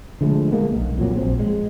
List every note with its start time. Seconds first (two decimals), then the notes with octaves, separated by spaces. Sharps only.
0.21 D3 F3 G#3 A3
0.52 G#3 A#3 B3
0.72 D#1 B1
0.98 F2 A#2 F#3
1.17 A#1 C4
1.39 G#3